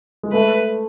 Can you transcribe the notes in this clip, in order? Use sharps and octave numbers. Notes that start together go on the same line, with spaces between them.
G#3
A3 B4